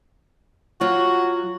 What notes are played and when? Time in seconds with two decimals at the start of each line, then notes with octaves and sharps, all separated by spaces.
0.81 F#3 F4 F#4